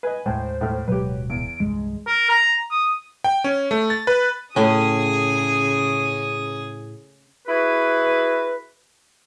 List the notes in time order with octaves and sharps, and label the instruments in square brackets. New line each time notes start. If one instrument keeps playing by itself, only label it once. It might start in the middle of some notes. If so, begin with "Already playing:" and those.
[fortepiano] B4 D#5 [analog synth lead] G#5
[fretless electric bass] D#2 G#3 [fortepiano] A2 G#5 [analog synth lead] C5
[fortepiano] A2 A3 F6
[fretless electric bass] D1 B2 G#3 [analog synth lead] F#3 [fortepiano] G4 B4
[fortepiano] E2 [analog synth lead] D7
[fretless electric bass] C2 G2 E3 [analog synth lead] G#3
[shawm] A#4
A#5
D#6
[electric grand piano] G5
C#4
A3
A6
B4
[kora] A2 C#4 [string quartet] C#3 G#4 D#6
[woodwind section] E4 F#4 G#4 B4